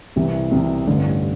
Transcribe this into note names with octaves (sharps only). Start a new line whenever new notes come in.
C2 C3 E3
C2 C3 E3
A1 G2 D3